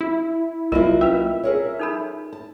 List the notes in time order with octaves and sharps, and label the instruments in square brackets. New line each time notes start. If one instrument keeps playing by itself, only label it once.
[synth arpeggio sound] E4
[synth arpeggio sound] C2 [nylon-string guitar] F#3 A#3 E4 [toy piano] F4 A#4 D#5
[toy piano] C#4 B4 [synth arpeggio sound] E5
[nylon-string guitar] G#4 A#4 C#5
[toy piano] D#4 A4 B5
[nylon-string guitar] A5